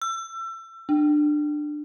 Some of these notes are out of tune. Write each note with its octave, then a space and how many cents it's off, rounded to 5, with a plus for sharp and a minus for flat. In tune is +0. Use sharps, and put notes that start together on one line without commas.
E6 +30
D4 +20